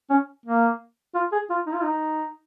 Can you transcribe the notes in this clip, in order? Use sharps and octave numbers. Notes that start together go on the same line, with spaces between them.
C#4
A#3
F4
G#4
F4
D#4
F4
D#4